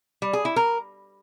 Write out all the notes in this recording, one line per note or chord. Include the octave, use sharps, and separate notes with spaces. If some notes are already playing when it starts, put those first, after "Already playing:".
G3
G#4
E4
A#4